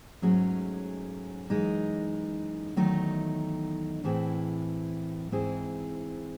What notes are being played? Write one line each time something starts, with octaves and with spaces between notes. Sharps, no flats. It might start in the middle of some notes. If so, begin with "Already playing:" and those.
G#2 F#3 A3 C#4 G#4
F#2 E3 G#3 D#4
E2 D#3 F#3 A3 D#4
A2 E3 C4 E4 G#4
G#2 E3 C4 E4 G#4